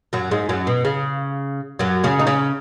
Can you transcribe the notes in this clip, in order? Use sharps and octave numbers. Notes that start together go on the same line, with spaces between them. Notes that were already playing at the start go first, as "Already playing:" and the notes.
F#2 F#3
G#2 G#3
F#2 F#3
B2
C#3
F#2 F#3
C#3 C#4
D#4
C#3 C#4